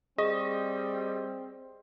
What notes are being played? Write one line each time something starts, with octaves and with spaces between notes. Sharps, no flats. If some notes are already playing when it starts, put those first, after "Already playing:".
G3 C4 G#4 D#5